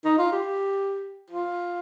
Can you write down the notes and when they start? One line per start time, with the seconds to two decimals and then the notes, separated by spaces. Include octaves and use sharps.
0.05 D#4
0.18 F4
0.32 G4
1.30 F4